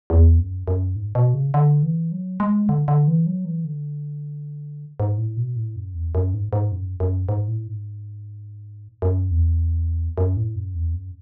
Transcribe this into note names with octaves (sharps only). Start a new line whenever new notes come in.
E2
F#2
F#2
G#2
B2
C#3
D3
E3
F#3
G#3
D3
D3
E3
F#3
E3
D3
G#2
A2
B2
A2
F#2
E2
F#2
G#2
G#2
F#2
F#2
G#2
A2
G#2
F#2
E2
F#2
A2
F#2
E2
F#2